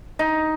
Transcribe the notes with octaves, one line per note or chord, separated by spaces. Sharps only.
D#4